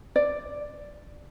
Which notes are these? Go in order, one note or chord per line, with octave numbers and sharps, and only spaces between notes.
D5